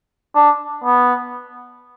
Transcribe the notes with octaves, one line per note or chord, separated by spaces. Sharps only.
D4
B3